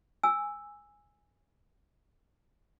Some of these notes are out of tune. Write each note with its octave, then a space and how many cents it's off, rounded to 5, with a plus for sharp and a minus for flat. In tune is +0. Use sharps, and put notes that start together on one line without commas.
G#5 -10 E6 +0